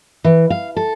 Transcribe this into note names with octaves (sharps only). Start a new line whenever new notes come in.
E3
F5
A4